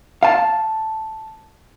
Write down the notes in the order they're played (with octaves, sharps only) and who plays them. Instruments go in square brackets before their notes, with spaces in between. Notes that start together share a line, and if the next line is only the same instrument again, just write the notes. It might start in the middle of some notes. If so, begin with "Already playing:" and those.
[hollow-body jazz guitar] F5 A5